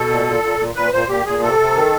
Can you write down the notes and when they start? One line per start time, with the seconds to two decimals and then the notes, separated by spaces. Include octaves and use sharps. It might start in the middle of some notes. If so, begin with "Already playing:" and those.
Already playing: B2 A4
0.10 A#2
0.26 A#2
0.43 A#2
0.59 A#2
0.75 A#2 B4
0.93 A#2 C5
1.08 A#2 G4
1.26 A#2 G#4
1.42 C3 A4
1.59 C3
1.75 D#3